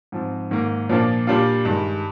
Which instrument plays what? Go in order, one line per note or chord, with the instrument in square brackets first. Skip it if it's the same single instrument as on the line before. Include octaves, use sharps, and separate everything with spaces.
[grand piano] G#2 F3 C4
G#2 D#3 A#3
A#2 F3 A#3 D4 F4
A#2 G3 D4 F4
G2 D#3 G#3